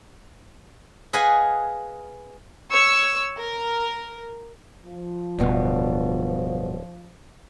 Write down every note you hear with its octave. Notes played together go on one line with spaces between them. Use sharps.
G#4 B4 D#5 F5 F#5 G#5
C#5 C#6 E6
A#4
F3
D1 G2 B2 B3